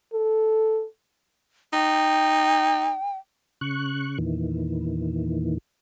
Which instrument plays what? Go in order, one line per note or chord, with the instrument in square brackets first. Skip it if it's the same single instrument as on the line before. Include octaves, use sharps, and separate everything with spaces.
[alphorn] A4
[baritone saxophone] D#4 [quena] G5
[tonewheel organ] C#3 C#6 F#6
E2 A#2 D#3 E3